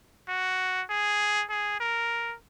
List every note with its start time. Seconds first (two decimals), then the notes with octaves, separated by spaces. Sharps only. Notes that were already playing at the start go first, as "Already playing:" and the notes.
0.28 F#4
0.90 G#4
1.49 G#4
1.80 A#4